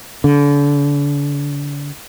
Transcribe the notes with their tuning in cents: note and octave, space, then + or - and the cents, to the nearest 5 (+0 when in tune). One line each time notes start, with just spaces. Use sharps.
D3 -35